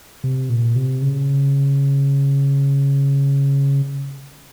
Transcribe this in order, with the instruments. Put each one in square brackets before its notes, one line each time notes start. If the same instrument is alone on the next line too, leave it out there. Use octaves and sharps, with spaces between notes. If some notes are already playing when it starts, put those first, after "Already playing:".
[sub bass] C3
A#2
C3
C#3